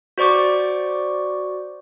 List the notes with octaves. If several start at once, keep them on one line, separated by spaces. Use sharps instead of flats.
F#4 C5 D5 C#6 D6